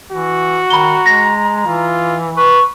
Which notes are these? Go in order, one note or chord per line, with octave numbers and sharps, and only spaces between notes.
E3 F#4
D#3 A#5 B5 G7
G#3 A#6
E3 F4
B4 C#6